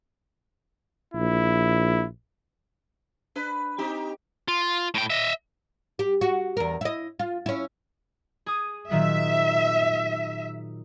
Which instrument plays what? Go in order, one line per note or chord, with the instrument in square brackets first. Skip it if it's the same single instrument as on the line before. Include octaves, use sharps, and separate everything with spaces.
[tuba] A#1 [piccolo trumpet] E4
[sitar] D4 B4
C4 D#4 G4
[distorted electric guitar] F4
A2 G5
D#5 E5
[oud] G4
F#4
E2 A#4
E4 D#5
F4
C#4 E4
[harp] G#4 D#6
[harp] A#2 D#3 F#3 [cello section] E5